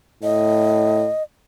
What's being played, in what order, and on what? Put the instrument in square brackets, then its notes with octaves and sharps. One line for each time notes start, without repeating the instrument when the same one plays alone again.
[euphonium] A2 [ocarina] D#5